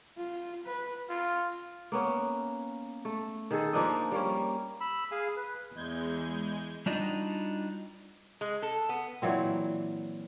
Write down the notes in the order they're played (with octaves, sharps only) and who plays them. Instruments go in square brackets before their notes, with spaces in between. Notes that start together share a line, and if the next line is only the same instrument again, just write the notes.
[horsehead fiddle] F4
B4
[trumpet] F4
[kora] A#3 B3 C#4
A3
D#3 G#4 A4
F3 A#3 D4 D#5
G3 A#3 C#4
[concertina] B5 E6
G#4 F5 G#5
B4
[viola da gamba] E2 [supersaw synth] G#3 G6 G#6
[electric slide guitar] G3 D4 D#4 F4 F#4
[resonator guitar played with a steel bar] G#3
A4
B3
[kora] A#2 E3 F#3 C4